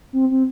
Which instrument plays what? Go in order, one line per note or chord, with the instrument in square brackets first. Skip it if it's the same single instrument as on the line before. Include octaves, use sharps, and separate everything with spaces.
[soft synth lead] C4
C4